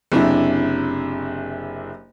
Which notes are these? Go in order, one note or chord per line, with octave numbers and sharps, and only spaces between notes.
F#1 C3 D4 E4